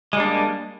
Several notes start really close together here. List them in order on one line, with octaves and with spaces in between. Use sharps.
G#3 G3 D4 A#3